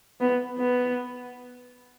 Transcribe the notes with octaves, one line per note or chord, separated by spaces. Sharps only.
B3
B3